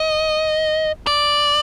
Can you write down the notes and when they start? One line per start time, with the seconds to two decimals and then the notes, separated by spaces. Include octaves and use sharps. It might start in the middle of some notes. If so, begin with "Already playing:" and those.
Already playing: D#5
1.07 D5